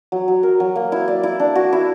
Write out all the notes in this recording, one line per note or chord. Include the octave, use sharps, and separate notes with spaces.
F#3
F#3
A#4
F#3
A#3
E4
D5
E4
D4
F#4
E4